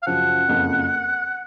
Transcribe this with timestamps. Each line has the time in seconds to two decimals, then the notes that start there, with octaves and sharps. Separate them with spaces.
0.02 F5
0.06 F#2 C#3 F3 F#5
0.49 F#1 F2 C#3